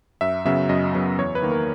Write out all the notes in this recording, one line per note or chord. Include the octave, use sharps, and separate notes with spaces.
F#2 E5
C#3 F#3 B3 E5
F#2 D#5
C#3 F#3 B3
E2 C#5
B4
D#3 A#3
A#4